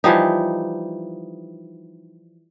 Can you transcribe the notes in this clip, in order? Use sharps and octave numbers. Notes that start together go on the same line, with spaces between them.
E3 F3 G3 D#4